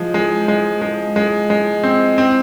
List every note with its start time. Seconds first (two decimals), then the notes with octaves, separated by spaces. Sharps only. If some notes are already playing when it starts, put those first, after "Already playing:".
Already playing: F3 G#3
0.14 G#3
0.48 G#3
0.81 G#3
1.16 G#3
1.50 G#3
1.83 C4
2.18 C4